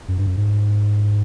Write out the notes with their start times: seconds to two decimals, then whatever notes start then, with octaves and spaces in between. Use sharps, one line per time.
0.08 F#2
0.18 G2
0.26 F#2
0.37 G#2